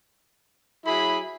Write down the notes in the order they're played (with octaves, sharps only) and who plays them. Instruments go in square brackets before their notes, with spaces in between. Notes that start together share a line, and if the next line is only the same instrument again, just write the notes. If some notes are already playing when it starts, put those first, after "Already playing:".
[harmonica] F#3 E4 [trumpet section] G#4 B5